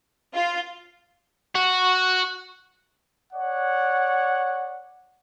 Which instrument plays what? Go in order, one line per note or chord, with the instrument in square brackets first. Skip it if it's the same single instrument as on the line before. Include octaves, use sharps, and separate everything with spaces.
[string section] F4
[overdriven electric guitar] F#4
[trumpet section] C#5 D5 F#5